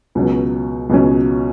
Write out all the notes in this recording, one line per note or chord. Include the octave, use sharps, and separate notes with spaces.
C#2 B2 F#3 C#4
C#2 B2 F#3 C#4